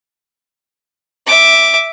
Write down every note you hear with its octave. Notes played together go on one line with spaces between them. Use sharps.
E5 D6